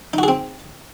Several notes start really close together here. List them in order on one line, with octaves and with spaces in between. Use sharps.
D#4 F#4 G#4 C4